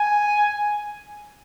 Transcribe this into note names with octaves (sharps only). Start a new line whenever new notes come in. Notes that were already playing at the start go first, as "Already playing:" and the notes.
Already playing: G#5